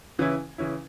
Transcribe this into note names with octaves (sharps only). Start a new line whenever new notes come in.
C#3 E3 C#4 E4
C#3 E3 C#4 E4